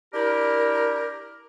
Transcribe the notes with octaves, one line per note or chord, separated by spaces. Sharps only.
D4 E4 G4 A#4